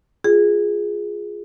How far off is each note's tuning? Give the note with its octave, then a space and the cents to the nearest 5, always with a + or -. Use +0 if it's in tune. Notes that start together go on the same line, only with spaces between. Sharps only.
F4 +5 G#4 +0